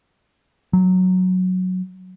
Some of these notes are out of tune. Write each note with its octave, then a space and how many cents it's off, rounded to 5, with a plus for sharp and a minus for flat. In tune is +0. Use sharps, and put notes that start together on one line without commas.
F#3 -5